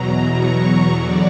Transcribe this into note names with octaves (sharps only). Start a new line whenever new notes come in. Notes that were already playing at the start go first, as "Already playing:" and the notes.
Already playing: E2 B2 F#3 A#5
C#6
E2 D3 F#3 D5